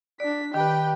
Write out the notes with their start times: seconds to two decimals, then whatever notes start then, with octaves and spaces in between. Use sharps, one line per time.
0.20 D4 D5 B6
0.54 D#3 G4 B4 G5